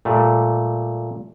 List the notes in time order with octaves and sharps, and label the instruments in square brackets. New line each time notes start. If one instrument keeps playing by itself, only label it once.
[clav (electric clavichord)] A#2 G3 A3